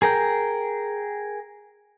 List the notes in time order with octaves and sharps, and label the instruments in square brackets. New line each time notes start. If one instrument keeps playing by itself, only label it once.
[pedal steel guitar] G#4 A#4 G5